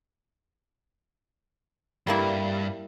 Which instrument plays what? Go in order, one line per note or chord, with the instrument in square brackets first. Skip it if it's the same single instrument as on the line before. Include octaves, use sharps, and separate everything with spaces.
[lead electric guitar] G2 [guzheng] G3 A#3 E4